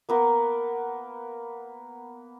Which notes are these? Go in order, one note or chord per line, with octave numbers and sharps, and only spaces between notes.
A#3 B3 A#4